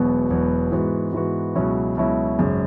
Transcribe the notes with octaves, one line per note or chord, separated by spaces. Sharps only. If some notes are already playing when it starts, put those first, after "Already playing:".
Already playing: E1 E2 B2 F#3 B3
E1 E2 B2 F#3 B3
G#2 E3 B3 F#4
G#2 E3 B3 F#4
C#2 B2 F#3 C#4 E4
C#2 B2 F#3 C#4 E4
G#1 F#2 C#3